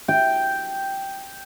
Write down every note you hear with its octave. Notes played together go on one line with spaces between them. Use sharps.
G5